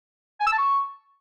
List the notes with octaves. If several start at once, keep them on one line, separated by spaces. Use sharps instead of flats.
G#5
E6
A5
C#6